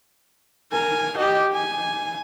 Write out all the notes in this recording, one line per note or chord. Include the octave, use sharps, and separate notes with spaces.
A#4 G#5
G4 D#5
G#5